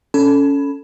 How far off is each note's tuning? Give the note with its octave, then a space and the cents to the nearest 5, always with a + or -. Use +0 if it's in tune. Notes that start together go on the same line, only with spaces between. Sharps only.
C#4 +15 A4 +0 B5 +0